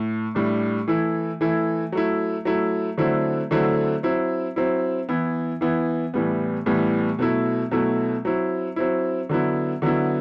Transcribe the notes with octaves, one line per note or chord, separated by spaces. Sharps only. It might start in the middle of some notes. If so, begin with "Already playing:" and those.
Already playing: A2
A2 G3 D4
E3 A3 E4
E3 A3 E4
F#3 A3 E4
F#3 A3 E4
D3 F#3 A3 C4 E4
D3 F#3 A3 C4 E4
F#3 C4 E4
F#3 C4 E4
E3 B3 E4
E3 B3 E4
A2 E3 G3 B3
A2 E3 G3 B3
B2 F#3 A3 E4
B2 F#3 A3 E4
F#3 C4 E4
F#3 C4 E4
D3 F#3 B3 E4
D3 F#3 B3 E4